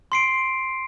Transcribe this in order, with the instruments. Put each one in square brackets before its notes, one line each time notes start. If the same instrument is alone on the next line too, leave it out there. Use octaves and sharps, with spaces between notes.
[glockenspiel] C6 C7 D7